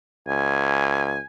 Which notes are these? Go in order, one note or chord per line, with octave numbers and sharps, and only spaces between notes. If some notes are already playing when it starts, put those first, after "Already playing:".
C#2 G#5